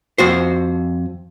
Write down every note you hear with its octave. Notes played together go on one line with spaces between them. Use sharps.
F2 F#4 C5